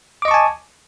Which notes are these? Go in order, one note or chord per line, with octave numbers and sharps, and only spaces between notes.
D#5 G#5 A5 C#6 D6